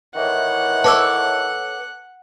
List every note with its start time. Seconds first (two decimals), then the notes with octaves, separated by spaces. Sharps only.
0.16 A2 D#3 E3 F#5
0.84 A4 B4 C#5 A5 D6 E6